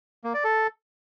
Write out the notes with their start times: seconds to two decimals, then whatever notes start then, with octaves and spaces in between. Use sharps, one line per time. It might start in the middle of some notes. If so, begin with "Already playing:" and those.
0.24 A#3
0.34 D5
0.44 A4